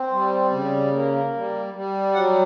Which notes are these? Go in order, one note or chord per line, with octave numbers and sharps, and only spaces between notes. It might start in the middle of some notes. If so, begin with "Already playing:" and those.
Already playing: C4
G3
C#3
A#3
G3
G3
F#3 F#5